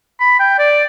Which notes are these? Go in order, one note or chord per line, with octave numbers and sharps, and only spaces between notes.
B5
G5
D5